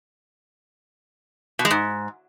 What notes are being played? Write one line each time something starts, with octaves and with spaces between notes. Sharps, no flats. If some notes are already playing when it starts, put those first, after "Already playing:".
B2
G#3
G#2